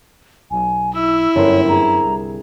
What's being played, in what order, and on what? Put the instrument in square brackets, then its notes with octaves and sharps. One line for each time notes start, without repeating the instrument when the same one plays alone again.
[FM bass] B1 [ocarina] G#5
[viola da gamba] E4 [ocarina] E6
[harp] G1 A#4 C5 [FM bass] F#2 [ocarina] C#5
[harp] C4 G#4 [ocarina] A#5
[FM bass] C2